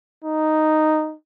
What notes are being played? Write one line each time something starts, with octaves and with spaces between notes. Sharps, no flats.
D#4